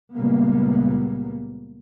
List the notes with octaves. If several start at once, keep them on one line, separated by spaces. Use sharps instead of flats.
C#2 A#2 G3 A#3 B3